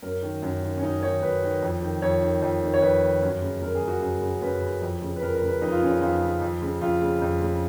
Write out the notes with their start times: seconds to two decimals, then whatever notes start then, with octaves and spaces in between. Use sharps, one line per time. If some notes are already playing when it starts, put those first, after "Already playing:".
0.02 F#2 A#4
0.23 D#3
0.42 F#2
0.63 D#3
0.77 C#4
0.82 F#2 D#4
1.03 D#3 C#5
1.22 F#2 B4
1.42 D#3
1.62 F2
1.82 D#3
2.02 F2 C#5
2.22 D#3
2.42 F2
2.62 D#3
2.74 C#5
2.82 F2 B4
3.02 D#3
3.22 F#2
3.42 C#3
3.62 F#2 A#4
3.75 G#4
3.82 C#3
3.88 F#4
4.01 F#2 G#4
4.22 C#3
4.42 F#2 B4
4.62 C#3
4.82 F2
5.02 C#3
5.16 B4
5.22 F2 A#4
5.35 A#4
5.42 C#3
5.48 B4
5.62 F2 D#4
5.72 F4
5.82 C#3 C#4
5.91 D#4
6.01 F2 F4
6.22 C#3
6.41 F2
6.62 C#3
6.81 F2 F4
7.02 C#3
7.22 F2
7.42 C#3